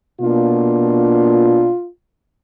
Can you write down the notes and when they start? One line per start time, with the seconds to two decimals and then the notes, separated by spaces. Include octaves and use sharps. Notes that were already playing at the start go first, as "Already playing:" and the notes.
0.21 B2 A#3 D4 F4